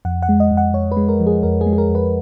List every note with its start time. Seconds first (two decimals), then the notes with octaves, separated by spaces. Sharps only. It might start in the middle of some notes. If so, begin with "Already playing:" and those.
0.05 F2 F#5
0.22 F#5
0.29 G#3
0.40 D#5
0.51 F2
0.57 F#5
0.74 F2 C#5
0.92 B4
0.97 G#3
1.09 A#4
1.20 F3
1.27 G#4
1.43 F2 A#4
1.61 G#4
1.66 G#3
1.73 G#4
1.78 A#4
1.89 F2
1.95 B4